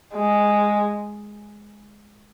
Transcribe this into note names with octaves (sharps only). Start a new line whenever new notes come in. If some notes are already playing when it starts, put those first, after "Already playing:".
G#3